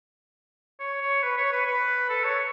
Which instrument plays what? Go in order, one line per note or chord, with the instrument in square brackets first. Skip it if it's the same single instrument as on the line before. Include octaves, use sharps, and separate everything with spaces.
[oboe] C#5
C#5
B4
C#5
B4
B4
A4
C#5